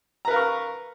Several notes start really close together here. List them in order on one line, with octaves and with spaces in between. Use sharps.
A#5 B4 A#4 F5 C#6